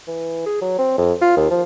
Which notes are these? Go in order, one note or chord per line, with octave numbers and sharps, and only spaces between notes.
E3
G#4
F#3
C4
F2
F4
D#2
F3